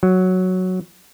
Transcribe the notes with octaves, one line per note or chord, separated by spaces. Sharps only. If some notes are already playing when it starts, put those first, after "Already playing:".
F#3